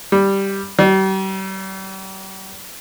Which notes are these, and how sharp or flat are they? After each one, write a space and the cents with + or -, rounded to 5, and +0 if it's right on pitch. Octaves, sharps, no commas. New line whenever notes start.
G3 +0
G3 -40